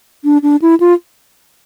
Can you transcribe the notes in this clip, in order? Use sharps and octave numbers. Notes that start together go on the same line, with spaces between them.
D4
D4
E4
F4